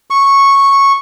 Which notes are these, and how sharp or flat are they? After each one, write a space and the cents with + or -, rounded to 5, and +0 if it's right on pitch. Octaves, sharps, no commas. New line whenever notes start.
C#6 -5